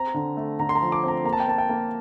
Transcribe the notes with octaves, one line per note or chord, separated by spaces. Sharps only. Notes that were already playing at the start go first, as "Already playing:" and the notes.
Already playing: C4 A#5
D3
A3
D3 A#5
C6
A#5
F3
D6
C4 A#5
A#3 A#5
A5
G5
A#3 A5
G5
A#3